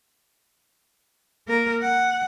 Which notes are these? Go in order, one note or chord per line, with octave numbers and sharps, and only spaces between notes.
A#3 A#4
F#5